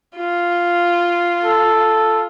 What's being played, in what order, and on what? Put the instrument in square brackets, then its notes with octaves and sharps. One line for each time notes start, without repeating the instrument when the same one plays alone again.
[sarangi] F4
[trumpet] A4